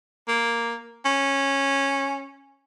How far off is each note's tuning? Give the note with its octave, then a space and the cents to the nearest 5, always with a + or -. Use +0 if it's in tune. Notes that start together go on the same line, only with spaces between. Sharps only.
A#3 +0
C#4 -10